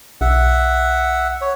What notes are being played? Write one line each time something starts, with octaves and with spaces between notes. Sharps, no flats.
B1 E5 F#5
C#5